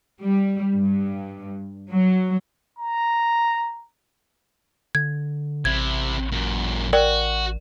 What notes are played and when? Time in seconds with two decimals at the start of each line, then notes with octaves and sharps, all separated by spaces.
0.22 G3
0.74 G2
1.92 F#3
2.79 A#5
4.95 D3 G#6
5.65 A1 C3 E4 G#6
6.32 F#2 A#2
6.93 F#4 A#4 D5 G5